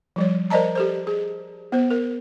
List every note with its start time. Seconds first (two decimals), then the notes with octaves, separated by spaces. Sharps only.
0.16 F3 G3 C#5
0.50 A#4 C5 D5 D#5 A5 A#5
0.75 G4 A4 C5
1.07 G#4
1.72 B3 C5
1.91 A#4